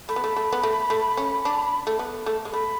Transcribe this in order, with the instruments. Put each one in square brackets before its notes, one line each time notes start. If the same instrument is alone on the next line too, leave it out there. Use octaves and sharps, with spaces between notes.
[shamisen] A3 [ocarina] B5
[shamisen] B3
A3
A3
B3
A3
A3
C#4
D4
A3
B3
A3
G#3
[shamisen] A3 [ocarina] B5